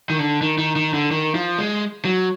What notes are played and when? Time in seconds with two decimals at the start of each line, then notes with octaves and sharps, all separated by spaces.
0.10 D#3
0.18 D3
0.42 D#3
0.58 D#3
0.76 D#3
0.94 D3
1.11 D#3
1.35 F3
1.58 G#3
2.05 F#3